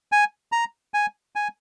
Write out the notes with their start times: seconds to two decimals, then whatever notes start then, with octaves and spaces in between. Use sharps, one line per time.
0.12 G#5
0.52 A#5
0.94 G#5
1.35 G#5